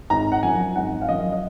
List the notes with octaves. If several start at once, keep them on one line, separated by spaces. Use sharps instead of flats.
G#1 A#5
F#5
F#2 F3 G#5
G#1 F#5
F5
F#2 F3 D#5
D#5